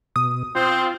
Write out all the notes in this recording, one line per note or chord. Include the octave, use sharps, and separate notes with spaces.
B2 D#6
C4 F4 C5